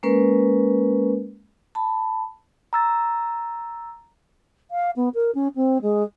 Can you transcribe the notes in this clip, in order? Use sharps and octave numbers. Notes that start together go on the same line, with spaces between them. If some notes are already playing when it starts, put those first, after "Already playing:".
G#3 A#3 C#4 A#4 B4
A5 B5
A#5 E6 A6
F5
B3
A#4
C#4
C4
G#3